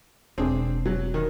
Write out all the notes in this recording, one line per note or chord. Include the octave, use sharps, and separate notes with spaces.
E1 C4 D4 G#4
F#3
D#3